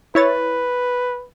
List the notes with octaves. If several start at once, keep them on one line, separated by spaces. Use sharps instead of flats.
E4 B4 C#5 A6